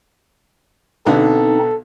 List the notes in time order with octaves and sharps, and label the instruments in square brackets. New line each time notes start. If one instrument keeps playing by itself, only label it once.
[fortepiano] B1 D3 B3 [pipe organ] C4 D#4 [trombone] A4